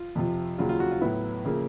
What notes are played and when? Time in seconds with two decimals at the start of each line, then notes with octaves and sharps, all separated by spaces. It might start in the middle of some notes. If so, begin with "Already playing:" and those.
Already playing: F4
0.15 F2 C3 F3
0.58 D#2 C#3 F#3 F4
0.69 F4
0.80 F#4
0.91 F4
1.01 A2 F#3 B3 E4
1.45 C#3 F3 A#3